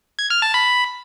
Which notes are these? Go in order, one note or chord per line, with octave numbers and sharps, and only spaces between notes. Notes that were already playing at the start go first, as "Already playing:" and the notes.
G#6
F6
A5
B5